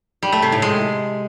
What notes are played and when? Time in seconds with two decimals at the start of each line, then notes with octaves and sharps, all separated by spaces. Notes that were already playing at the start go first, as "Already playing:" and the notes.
0.22 G3
0.32 A3
0.42 C3
0.52 A2
0.62 G#3